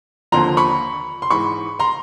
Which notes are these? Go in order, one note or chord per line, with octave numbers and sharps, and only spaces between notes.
D#2 D3 F3 A#5 C6
B5 C#6
C6
G#2 E3 B5 C#6
A#5 C6